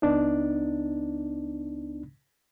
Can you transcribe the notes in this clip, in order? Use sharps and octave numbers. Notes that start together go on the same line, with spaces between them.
C#2 B3 D4 D#4